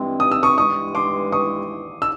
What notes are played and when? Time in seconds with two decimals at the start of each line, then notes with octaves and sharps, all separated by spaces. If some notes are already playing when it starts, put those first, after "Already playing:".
Already playing: G2 E3 G#3 C4
0.20 D#6
0.31 E6
0.43 C#6 D#6
0.57 G2 E3 G#3 B3 C#6 D#6
0.95 C6 D6
1.32 C#6 D#6
2.02 E6